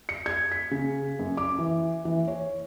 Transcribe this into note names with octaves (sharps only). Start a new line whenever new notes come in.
C#7
G#6
B6
C#3
F#2
D6
E3
E3
C#5